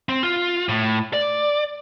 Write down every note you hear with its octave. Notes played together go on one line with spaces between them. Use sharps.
C4
F4
A2
D5